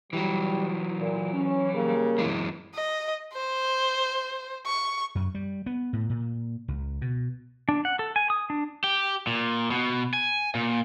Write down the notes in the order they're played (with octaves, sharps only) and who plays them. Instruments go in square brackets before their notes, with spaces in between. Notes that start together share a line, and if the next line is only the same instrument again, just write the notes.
[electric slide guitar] E3 F#3 [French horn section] G3
[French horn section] A#2
C#4
C#3 G3 A#3
[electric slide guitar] F#2 E3 G#3
[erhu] D#5
C5
C#6
[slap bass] F#2
G3
B3
A2
A#2
C#2
B2
[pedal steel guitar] D4
F#5
A4
G#5
D#6
D4
[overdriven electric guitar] G4
A#2
B2
G#5
A#2